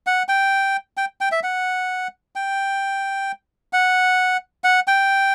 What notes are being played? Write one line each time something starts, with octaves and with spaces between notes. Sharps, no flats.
F#5
G5
G5
G5
E5
F#5
G5
F#5
F#5
G5